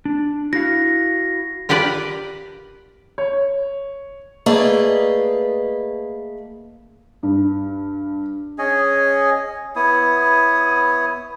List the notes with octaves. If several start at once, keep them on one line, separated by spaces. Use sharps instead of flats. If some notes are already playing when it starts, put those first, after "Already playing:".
D4
E4 F#4 F5 A#6
F4 G4 A#4 B4 D5
C#5
A3 A#3 G#4 B4 D5 D#5
G2
C#4 G#4 C#5 D#5
B3 E4 C#5 D#6